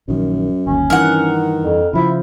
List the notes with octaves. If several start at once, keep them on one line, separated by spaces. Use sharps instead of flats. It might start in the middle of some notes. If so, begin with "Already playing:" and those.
A#1 F#2 D#3
G1 D#2 C#4
G2 D#3 E3 A#4 F#5
F2
C#3 F3 E4